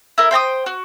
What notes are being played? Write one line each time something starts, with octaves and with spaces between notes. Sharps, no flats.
E4 A#4
C5 G5 A#5 D#6
F#4